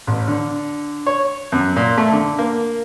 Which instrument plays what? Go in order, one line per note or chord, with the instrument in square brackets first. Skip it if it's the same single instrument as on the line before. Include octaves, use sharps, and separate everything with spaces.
[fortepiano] A1
D3
C#5
F#2
A#2
A3
D3
A#3